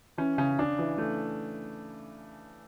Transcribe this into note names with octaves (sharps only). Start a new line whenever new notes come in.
E3 C#4
C#3 C#4
C#3 D4
E3
A3